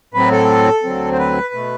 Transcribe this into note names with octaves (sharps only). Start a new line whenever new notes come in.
A2 F#3 C4 B4
A4
D2 D3 F#3 C4
C5
B4
B2 A3